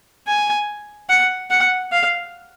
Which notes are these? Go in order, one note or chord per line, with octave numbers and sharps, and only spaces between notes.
G#5
F#5
F#5
F5